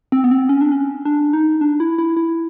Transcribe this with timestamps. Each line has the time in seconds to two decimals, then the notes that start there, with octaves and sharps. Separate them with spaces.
0.12 C4
0.24 B3
0.31 C4
0.49 C#4
0.61 D4
0.72 C#4
1.05 D4
1.33 D#4
1.61 D4
1.80 E4
1.98 E4
2.17 E4